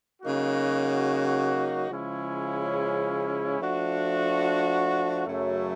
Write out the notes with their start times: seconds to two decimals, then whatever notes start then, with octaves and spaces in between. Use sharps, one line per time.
0.22 C#3 F#3 A#3 D#4 F#4
1.90 C#3 F3 G#3 C#4 E4
3.59 F3 A3 D4 F#4
5.26 F#2 C#3 F#3 A3